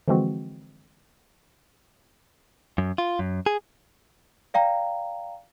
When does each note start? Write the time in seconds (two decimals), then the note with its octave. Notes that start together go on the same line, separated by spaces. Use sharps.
0.08 D3 E3 F3 G#3 C4 F#4
2.78 F#2
2.98 F4
3.19 F#2
3.46 G#4
4.54 D5 F5 G5 A#5